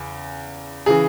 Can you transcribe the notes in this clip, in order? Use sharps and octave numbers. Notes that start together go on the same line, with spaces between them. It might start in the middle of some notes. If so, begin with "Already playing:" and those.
Already playing: E2 C#3
C#3 E3 G#4